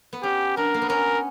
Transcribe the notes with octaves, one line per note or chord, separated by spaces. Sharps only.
B3
C#4 G4
D4 A#4
A#3
B3
C#4 A#4